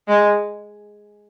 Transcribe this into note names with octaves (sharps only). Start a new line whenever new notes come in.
G#3